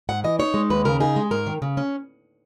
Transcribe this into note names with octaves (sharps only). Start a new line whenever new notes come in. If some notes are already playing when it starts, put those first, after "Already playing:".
G#2 F#5
E3 D#5
D#4 C#5
G#3
D#2 B4
C#3 A#4
D#4 G#4
G#3
G#2 A#4
D#3
C#3
C#4